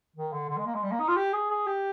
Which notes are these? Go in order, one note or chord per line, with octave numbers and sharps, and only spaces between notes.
D#3
D3
D3
G#3
A#3
G#3
G3
A#3
D#4
F4
G4
G#4
G#4
G4